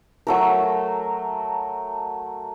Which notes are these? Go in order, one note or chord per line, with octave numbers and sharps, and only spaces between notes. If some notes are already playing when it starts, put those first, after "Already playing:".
F#3 A3 A#4